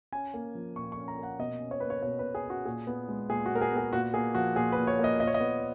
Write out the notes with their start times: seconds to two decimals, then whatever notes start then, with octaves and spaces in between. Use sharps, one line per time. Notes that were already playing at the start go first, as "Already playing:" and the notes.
0.12 C#4 G#5
0.34 A#3
0.55 F3
0.76 A#2 C#6
0.92 C#6
0.97 C#4
1.08 A#5
1.18 A#3 F#5
1.39 B2 D#5
1.60 C#4
1.71 C#5
1.80 A#3 B4
1.90 C#5
2.02 B2 C#5
2.19 B4
2.23 B2
2.35 G#4
2.45 C#4
2.50 F#4
2.65 A#2 G#4
2.87 B3
3.09 G#3
3.29 A#2 G#4
3.46 F#4
3.51 A#2 A#4
3.61 G#4
3.72 B3
3.77 G#4
3.93 A#2 F#4
4.14 A#3 G#4
4.35 F3 F#4
4.56 A#2 G#4
4.72 B4
4.77 A#2
4.87 C#5
4.99 A#3 D#5
5.20 A#2 D#5
5.27 C#5
5.34 D#5
5.40 B3